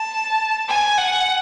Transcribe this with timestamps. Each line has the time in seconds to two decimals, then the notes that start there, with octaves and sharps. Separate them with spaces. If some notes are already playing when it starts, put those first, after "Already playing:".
Already playing: A5
0.68 G#5
0.98 F#5